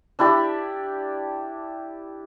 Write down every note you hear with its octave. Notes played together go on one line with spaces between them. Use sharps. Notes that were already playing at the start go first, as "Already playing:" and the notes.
D4 E4 G4 D5